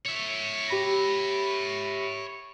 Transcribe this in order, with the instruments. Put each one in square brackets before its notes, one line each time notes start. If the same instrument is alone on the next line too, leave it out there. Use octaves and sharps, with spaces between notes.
[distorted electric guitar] C#5 E5
[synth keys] G4 B5 A#6